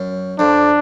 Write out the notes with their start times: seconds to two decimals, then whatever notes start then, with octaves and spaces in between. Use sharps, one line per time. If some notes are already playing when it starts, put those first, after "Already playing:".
Already playing: F#2
0.39 F2 D4